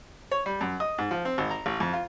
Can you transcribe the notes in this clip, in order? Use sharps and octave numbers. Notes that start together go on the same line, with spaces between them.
C#5
G3
F#2
D#5
G#2
F3
C4
G#1
A#5
A1
F2
F4